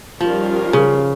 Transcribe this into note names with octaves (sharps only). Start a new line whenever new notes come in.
D#3 F3 G3 C#4 F4 A#4
C#3